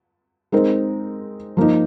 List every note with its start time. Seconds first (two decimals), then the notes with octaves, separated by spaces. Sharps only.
0.52 G#3 C4 D#4 A#4
1.57 F3 A#3 D#4